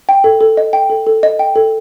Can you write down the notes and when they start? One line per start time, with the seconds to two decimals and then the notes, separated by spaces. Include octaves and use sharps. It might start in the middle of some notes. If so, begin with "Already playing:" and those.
0.09 G5
0.24 A4
0.41 A4
0.57 D#5
0.73 G5
0.90 A4
1.07 A4
1.23 D#5
1.39 G5
1.56 A4